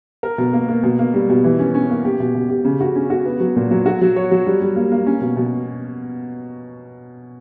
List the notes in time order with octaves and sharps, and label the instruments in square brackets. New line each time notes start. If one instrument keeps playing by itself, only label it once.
[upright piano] A#4
B2
A#3
A#3
B2
A#3
G3
B2
E3
C#4
C#4
A#3
G4
B2
B2
G4
C#3
F#4
C#4
F#4
B3
F#3
A#2
F#3
F#4
F#3
C#5
F#3
G3
G3
A#3
A#3
C#4
B2
B2